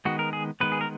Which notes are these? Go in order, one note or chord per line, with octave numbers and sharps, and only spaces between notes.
D#3 G#3 B3 F#4
A#4
G#4
D#3 G#3 B3 B4
G#4
A#4